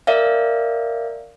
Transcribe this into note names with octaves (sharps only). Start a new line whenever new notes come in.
A#4 D5 E5 F5